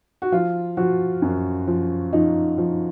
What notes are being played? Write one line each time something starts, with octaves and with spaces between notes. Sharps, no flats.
F#4
F3 F4
F3 F#4
F#2
F3
F3 D#4
F3